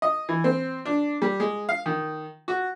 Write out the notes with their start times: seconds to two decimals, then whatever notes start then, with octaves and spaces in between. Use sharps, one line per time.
0.02 D#5
0.29 E3
0.44 C4
0.85 D4
1.22 G3
1.40 G#3
1.69 F5
1.86 D#3
2.48 F#4